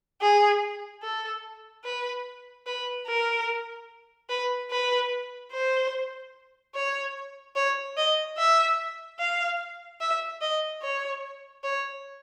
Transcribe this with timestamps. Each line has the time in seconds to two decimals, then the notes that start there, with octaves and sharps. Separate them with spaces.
0.22 G#4
1.03 A4
1.84 B4
2.67 B4
3.07 A#4
4.29 B4
4.71 B4
5.52 C5
6.74 C#5
7.56 C#5
7.97 D#5
8.38 E5
9.19 F5
10.01 E5
10.41 D#5
10.83 C#5
11.64 C#5